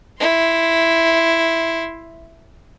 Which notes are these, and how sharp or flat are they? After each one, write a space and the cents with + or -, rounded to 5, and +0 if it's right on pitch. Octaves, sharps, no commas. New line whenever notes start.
E4 +0 C6 +0